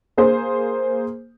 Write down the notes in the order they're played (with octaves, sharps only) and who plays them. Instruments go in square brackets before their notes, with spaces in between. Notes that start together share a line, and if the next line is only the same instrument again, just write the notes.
[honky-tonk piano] A#3 G#4 C5